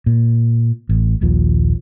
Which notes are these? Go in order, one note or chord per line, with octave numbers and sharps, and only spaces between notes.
A#2
A1
D#1 A#1 D#2 F3